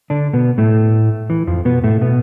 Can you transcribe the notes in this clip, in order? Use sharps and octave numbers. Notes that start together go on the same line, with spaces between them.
D3 D4
B2 B3
A2 A3
E3
F2 F3
B2 B3
A2 A3
B2 B3